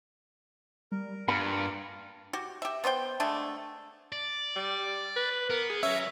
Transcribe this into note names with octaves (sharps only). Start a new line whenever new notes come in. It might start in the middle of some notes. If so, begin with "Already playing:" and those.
G3 A#4
G2 A#3 F4 A#4 B5 C#7
F#4 G4
G4 E5
B3 C5 C#5 G5
D3 G#3 A3 D4
D5
G3
B4
B3 A#4
G#4
F#3 C#4 C#5 E5